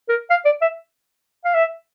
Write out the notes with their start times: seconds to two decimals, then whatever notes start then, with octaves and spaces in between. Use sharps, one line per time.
0.09 A#4
0.30 F5
0.45 D5
0.62 E5
1.45 F5
1.54 E5